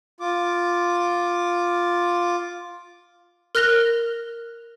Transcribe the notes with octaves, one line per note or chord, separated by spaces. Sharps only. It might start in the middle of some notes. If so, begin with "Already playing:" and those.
F4 D6
A#4 F6 F#6 A#6 F7 G7